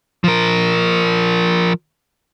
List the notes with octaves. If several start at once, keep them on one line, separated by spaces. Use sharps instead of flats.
F3 A#4